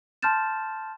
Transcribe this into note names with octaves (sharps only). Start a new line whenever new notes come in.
A5 C6 F6 G6 A6 E7